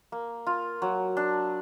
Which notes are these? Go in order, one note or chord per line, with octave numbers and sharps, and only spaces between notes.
A#3
F4
F#3
D4